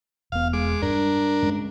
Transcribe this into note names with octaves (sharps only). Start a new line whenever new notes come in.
E1 B3 F5
G#3 D6
G2 D4 A#4
G#3 C#4